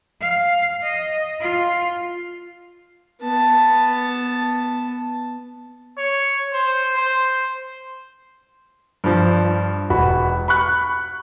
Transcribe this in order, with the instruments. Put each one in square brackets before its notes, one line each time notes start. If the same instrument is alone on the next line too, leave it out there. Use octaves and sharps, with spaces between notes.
[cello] F5
D#5
F4
[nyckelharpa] B3 A5
[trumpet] C#5
C5
C5
[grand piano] G2 F3
E1 F#4 B5
B5 C#6 F#6